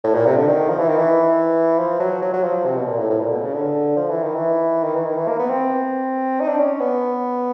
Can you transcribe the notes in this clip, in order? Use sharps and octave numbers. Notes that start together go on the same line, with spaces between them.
A2
A#2
C3
D3
D#3
F3
E3
D#3
E3
F3
F#3
F#3
F#3
F3
C3
B2
A#2
A2
A2
A#2
B2
C#3
D3
F3
E3
D#3
E3
D#3
E3
D#3
E3
A#3
B3
C4
D#4
D4
C#4
B3